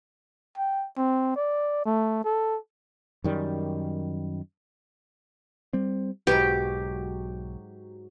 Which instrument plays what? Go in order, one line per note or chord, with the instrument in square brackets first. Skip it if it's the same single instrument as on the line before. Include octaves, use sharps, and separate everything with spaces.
[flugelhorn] G5
C4
D5
A3
A4
[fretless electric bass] F#2 D#3 G3
[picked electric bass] G3 C4
[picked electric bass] B1 [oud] G#2 F#3 B4 [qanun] G4